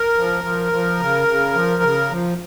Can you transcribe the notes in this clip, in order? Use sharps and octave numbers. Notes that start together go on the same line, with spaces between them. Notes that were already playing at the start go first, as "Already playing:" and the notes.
Already playing: A#4
F3
F3
F3
C#3
C#3
F3
C#3
F3